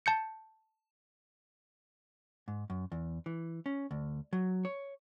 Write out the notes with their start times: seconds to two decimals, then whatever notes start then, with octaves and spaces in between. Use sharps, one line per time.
0.06 A5 G6 C#7
2.48 G#2
2.70 F#2
2.92 E2
3.26 E3
3.66 C#4
3.91 D2
4.33 F#3
4.65 C#5